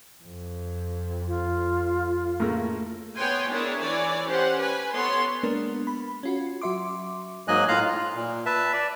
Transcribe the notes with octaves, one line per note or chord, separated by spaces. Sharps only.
F2
F4
A2 C#3 A#3
B3 C#5 G5 G#5 C6
D4 E4 G#4 A#4 C#5
E3 C#5 D5 G#5
C#4 G4 C5 F#5
B4 G#5
B3 A4 C#5 C6
G#3 A#3 B3 D4 A#4
B5
C#4 F4 F#4
F#3 F#4 E5 C6 D6
G#2 F#3 A#3 D#5 G#5 F#6
A2 F4 F5 A#5 F#6
F4
A#2
B4 E5 A5
D5